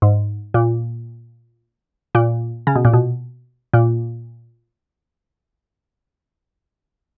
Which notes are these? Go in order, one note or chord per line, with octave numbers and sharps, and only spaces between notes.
G#2
A#2
A#2
C#3
B2
A#2
B2
A#2